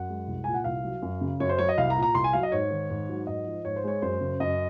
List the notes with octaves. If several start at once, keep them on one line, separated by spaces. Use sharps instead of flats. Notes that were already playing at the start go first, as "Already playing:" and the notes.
Already playing: F#2 F#5
G#3
C2
A#2 G#5
F#5
C2 F5
F#3
F#2
C#3
F#2 C#5
C5
F#3 C#5
D#5
C2 F5
A#5
A#2
A#5
C2 C6
G#5
F#3 F5
D#5
G#2 C#5
D#3
G#2
F#3
G#2 D#5
F3
G#2 C#5
C5
G#3 C#5
F#2 C5
C#3
F#2 D#5